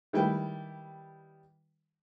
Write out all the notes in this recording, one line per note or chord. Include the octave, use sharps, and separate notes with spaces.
D#3 G3 E4 B4 G5